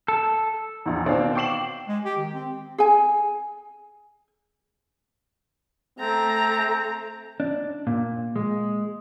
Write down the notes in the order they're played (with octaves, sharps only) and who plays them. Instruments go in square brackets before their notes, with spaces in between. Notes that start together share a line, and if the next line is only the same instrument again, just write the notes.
[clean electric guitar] A4
[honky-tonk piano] A#1 E2
B2 D#3 C4 D5 F5
G5 C#6 D6 C7 E7 F#7
[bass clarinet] G#3
G4
D#3
C4
[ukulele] G#4 G#5
[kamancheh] A3 A#5 [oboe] C4
[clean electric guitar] D4
A#2
G#3